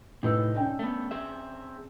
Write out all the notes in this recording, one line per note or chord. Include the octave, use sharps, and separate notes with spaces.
A2 C3 D#4 B4 E6
C#4 D4 G5
A3 B3
C4 G#4 E5